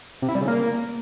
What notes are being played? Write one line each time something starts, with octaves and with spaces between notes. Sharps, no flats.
C3
E4
G3
C#3
A#3